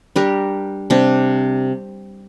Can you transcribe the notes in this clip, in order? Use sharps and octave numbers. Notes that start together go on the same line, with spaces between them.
G3 D4 G4 A#4
C3 G3 D4